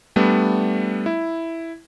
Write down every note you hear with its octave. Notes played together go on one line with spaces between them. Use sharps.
G3 A3 B3 D4
E4